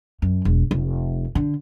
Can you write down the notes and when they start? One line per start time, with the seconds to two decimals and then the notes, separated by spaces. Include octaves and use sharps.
0.22 F#2
0.45 E1
0.71 F1
1.35 D3